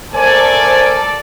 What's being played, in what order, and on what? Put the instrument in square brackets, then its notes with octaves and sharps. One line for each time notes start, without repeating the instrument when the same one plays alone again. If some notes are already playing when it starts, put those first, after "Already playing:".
[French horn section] A3 A#4 C5 [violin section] A4 D5 [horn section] G#5